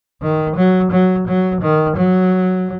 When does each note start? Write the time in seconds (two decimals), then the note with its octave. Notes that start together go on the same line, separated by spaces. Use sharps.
0.22 D#3
0.56 F#3
0.91 F#3
1.28 F#3
1.62 D#3
1.97 F#3